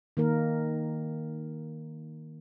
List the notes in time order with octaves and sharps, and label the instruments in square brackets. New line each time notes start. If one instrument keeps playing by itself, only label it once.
[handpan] D#3 A#3 A#4